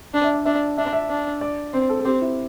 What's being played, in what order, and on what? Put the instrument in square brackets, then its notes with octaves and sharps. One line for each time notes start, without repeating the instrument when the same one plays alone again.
[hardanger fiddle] D4 [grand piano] D5
[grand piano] E5
D5
[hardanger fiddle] D4 [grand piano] E5
[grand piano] D5
[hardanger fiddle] D4 [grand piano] E5
[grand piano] D5
E5
[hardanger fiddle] D4
[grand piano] D5
[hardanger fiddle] C4 [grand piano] C5
[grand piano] A4
A4
[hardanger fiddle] C4 [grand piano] G4
[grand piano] E4